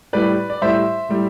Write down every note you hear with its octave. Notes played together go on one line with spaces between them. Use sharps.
A2 G3 B4 D5
D5
A2 G3 C5 E5
A2 G3